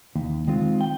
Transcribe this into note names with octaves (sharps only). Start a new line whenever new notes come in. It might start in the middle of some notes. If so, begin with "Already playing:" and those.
D#2
D#3 G#3 C4 F4
G5